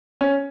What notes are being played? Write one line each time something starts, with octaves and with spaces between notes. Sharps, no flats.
C#4